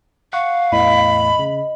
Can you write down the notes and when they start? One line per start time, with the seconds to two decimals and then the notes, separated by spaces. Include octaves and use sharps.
0.33 F5 F#5 C#6
0.72 E2 A2 E3 D#5 B5
1.39 C#3